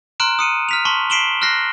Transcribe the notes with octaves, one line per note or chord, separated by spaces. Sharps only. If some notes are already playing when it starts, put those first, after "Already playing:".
A#5 C6 F6 F#6 D7 E7
D#6 C#7 D#7
F6 B6 F7
A5 C6 C#6 B6
B6 C7 D7 E7 F#7 G7
F6 F#6 A#6 C7